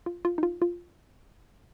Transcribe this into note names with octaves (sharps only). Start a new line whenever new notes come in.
F4
F4
D#4
F4
F4